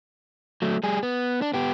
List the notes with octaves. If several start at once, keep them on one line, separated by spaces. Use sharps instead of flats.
F#3 A3
G3 G#4
B3
D4
B3 G4